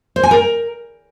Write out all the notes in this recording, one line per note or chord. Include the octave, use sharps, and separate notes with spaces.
C5
G#5
A#4